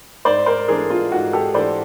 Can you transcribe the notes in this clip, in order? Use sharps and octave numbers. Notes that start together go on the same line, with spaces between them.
G#2 C5 D5
A#4 C5
E3 A3 D4 G#4 A#4
F4
G#2 F#4
G4 A4
E3 A3 D4 C5 D5